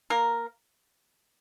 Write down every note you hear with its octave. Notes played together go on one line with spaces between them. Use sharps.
A#3 A#4